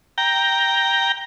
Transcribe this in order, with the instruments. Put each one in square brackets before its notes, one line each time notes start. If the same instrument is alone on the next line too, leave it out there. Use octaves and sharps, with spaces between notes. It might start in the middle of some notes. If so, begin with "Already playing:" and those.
[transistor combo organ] G5 A#5